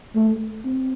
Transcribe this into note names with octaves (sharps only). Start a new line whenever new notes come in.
A3
C4